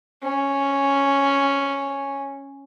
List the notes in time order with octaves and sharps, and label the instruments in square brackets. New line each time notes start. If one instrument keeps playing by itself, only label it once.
[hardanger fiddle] C#4